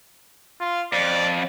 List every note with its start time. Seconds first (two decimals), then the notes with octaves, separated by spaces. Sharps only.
0.60 F4
0.93 F2 D5